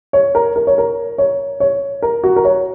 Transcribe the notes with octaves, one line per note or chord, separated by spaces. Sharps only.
C#5
A#4
A#4
C#5
A#4
C#5
C#5
A#4
F#4
A#4
C#5